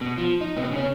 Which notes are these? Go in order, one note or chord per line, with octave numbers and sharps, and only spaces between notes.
B2
F3
D#4
C3 B3
C#3 C#4